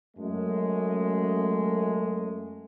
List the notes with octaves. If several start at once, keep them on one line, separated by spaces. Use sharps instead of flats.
F#2 G#3 A3